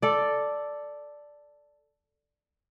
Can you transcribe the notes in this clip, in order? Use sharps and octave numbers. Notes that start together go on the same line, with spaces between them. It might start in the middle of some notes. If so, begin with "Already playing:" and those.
A4 D5